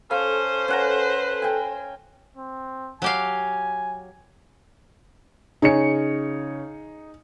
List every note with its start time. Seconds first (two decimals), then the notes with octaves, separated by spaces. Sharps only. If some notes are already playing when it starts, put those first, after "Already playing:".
0.11 C#4 A4 C5 F5
0.68 C#4 B4 F#5 A#5
1.42 G5 G#5
2.37 C4
3.02 F#3 G4 F5 G#5
5.62 C#3 D#4 G#4 C#5 C#7